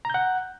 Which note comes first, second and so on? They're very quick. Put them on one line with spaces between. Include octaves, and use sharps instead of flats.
A#5 G6 F#5